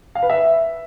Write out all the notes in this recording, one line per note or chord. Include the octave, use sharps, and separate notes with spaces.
F5
B4
E5